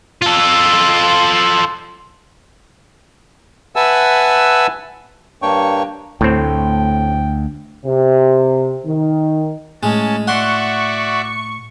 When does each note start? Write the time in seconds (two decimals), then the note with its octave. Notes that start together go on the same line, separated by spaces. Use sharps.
0.22 F4 A4
3.76 B4 E5 F#5 G#5 A5 E6
5.42 G2 A#3 D4 C#5 G5 C#6
6.21 D2 A2 C4 G5
7.85 C3
8.86 D#3
9.83 A2 G#3 C#4 A5
10.28 F#4 D5 E5 F#5 C6 C#6